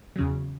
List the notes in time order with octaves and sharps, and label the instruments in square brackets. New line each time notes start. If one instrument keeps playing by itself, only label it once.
[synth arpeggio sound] E2 C#3 F#3